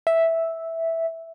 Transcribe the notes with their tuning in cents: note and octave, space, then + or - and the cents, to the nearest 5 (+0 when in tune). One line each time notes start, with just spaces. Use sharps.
E5 -5